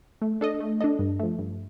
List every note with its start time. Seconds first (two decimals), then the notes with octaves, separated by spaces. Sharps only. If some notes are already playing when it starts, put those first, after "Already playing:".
0.22 A3
0.41 D4 A4 D#5
0.60 A3
0.81 D4 A4 D#5
0.99 G2
1.20 F3 A3
1.39 G2